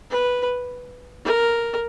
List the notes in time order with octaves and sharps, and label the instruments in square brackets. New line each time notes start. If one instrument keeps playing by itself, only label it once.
[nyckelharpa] B4
A#4